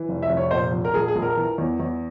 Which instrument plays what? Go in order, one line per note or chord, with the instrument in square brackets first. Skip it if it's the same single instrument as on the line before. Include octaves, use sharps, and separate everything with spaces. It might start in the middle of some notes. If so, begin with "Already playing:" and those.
Already playing: [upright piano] E3
F1
E5
F1
C#5
A#2 C5
F3
A#4
A#1 G#4
G#4
A#1
A#4
E3
E2
E2